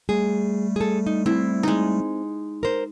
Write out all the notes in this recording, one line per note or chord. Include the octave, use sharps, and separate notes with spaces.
G3 A3 G#4
G#4 A4
D#4
C4 E4
G#3 D#4
A#4 C5